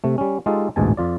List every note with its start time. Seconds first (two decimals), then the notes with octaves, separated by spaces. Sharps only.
0.04 C3 A3
0.18 G3 C#4
0.46 G#3 D#4 F4 G4 A4
0.76 A1 D2 G#2 B2 G#5 A5
0.97 F2 F4 D5